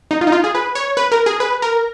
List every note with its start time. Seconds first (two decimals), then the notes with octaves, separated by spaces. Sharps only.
0.11 D#4
0.21 F4
0.27 D#4
0.32 F4
0.44 G#4
0.55 B4
0.75 C#5
0.97 B4
1.12 A#4
1.26 G#4
1.40 B4
1.62 A#4